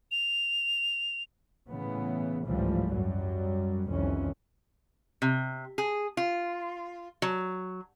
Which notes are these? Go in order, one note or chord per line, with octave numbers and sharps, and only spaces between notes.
F7
A2 C#3 E3 B3
G#1 C#2 A2 E3 F3 G3
F#2 F#3 G3
C2 F2 D#3 E3 C#4
C3
G#4
F4
F#3